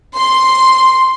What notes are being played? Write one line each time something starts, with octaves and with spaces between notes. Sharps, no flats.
C6